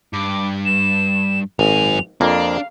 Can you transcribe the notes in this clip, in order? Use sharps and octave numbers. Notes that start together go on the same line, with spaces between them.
G2 D6
E7
G#1 F#2 G#5 F7
F2 A#3 D4 F5